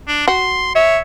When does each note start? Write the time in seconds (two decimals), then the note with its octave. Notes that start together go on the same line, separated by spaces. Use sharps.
0.08 D4
0.28 F#4 C6
0.75 C#5 E5